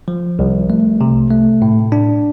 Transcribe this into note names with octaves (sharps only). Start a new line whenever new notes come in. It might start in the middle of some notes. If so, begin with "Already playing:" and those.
F3
C2
A3
C3
A3
A2
D4